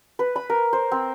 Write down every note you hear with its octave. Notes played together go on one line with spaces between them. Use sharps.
B4
B5
A#4
C5
C4